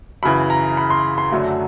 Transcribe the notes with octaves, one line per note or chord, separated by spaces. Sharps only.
F#2 C#3 E3 B5
A#5
B5
C6
C6
F#2 D3 F#3 A3